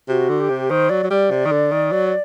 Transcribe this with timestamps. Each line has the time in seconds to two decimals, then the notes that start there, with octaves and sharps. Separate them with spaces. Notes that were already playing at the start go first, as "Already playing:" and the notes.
0.08 C3 F#4
0.29 D3
0.40 G4
0.49 C3
0.70 D#3 C5
0.90 F#3 D5
1.03 F#3
1.10 G3 D5
1.31 C3
1.45 D#3
1.51 D3
1.72 D#3
1.92 F#3